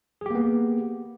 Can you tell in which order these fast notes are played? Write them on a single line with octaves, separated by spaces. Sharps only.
G#4 G4 A#3 B3